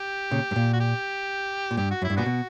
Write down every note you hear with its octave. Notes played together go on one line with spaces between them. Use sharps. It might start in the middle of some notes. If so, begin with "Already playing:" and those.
Already playing: G4
A#2 C#3
G2
A#2
F#4
G4
A#2
G2 G4
F#4
F#2 E4
G2
A#2 B3 D4 F#4
B2